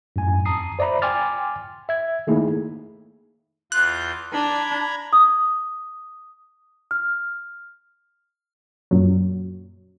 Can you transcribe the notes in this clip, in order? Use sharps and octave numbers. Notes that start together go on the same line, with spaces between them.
F#2 A2 G#5
F2 A5 A#5 D#6 C7
C5 D5 E5 A#5 B5
G5 G#5 C6 D6 F6 A6
E5 G#6
D#3 A3 A#3 D#4 E4 G#4
E2 F4 F#6 G6
D4 A#5 B5 G#6
D#6
F6
F#2 A#2 F#3